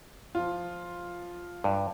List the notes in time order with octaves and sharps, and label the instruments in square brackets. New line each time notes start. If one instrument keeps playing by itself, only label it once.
[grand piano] F3 F4
[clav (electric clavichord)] G2